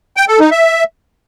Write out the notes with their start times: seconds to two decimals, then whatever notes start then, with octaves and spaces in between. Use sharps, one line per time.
0.17 G5
0.28 A4
0.40 D#4
0.51 E5